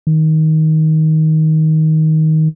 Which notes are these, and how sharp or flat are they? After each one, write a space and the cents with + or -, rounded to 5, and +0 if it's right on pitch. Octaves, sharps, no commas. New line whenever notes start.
D#3 +15